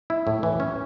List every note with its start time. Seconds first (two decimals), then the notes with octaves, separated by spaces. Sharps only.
0.10 E4
0.27 A2
0.43 E3
0.60 C#4